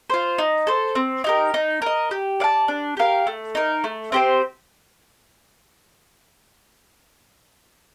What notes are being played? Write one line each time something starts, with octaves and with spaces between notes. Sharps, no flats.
F4 C5
D#4
A4 C5
C4
D#4 G4 A#4
D#4
A#4 D#5
G4
D5 F5 A5
D4
G4 A#4 F5
A3
D#4 A#4
A3
C4 G4 C5